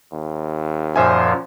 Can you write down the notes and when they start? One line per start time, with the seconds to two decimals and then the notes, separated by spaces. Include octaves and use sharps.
0.13 D#2
0.96 F#2 A#2 F3 C5 E5 G#5